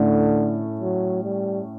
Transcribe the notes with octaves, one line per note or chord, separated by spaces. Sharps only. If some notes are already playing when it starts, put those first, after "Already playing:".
Already playing: A2 D3 A3 C#4
F#3
G3